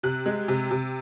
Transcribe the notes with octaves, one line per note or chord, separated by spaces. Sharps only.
C3 F#6
G#3
C3
C3